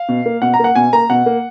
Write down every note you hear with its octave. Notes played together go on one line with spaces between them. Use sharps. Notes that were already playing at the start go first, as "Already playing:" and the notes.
Already playing: F5
B2
A#3
B2 F#5
A#5
A#3 F#5
B2 G#5
A#3 A#5
B2 F#5
A#3